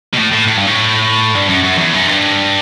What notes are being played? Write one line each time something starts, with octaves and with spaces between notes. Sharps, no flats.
B2
A2
A2
A2
G2
A2
G2
F#2
F#2
E2
F#2
G2